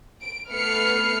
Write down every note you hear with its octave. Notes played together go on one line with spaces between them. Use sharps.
D7
A3 B3 B4 F6 C7 C#7